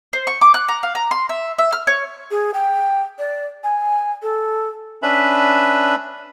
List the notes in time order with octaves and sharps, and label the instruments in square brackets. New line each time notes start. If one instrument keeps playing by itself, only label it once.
[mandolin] C5
C#6
D6
F#6
A#5
F5
A#5
C6
E5
E5
F6
C#5
[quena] G#4
G5
D5
G#5
A4
[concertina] C#4 D4 B4 E5 B5